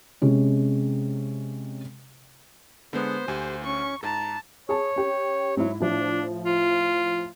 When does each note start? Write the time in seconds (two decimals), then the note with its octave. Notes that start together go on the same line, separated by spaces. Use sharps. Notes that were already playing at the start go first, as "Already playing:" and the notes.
0.22 C3 G#3 C#4
2.93 D3 G#3 B3 C5
3.28 D2 G4 G#5
3.64 C#4 C#6
4.03 G#2 A5 A#5
4.69 G#4 C#5 A5
4.96 C#4 G4
5.57 G#2 F#3 E4
5.80 A2 F3 D4
6.46 F4